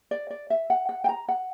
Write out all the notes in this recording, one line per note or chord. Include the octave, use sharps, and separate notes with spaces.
D5
D5
E5
F#5
F#5
G5
A#5
F#5